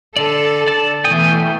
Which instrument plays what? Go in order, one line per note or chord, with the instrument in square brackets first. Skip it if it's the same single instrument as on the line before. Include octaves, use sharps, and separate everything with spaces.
[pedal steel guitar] D3 D5 [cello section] A4
[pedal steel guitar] D5 A5
[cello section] B2 E3 A3 [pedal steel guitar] G5 G#5 D#6